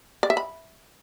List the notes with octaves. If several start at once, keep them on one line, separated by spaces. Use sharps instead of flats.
D5
E5
B5